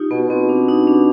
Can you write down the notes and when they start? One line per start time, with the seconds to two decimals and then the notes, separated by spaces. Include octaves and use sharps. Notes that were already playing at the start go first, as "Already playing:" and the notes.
Already playing: D#4 F4 G4
0.11 B2 B3
0.30 B2 C4
0.49 D4
0.69 D#4
0.87 D4